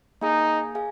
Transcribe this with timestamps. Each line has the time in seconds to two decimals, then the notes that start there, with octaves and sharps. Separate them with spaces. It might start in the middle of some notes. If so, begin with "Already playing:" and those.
0.21 A#3 D#4 G#4 F5 G#5
0.75 G#4 F5 G#5